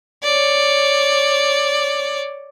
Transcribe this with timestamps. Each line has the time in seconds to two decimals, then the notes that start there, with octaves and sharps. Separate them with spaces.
0.23 C#5 D5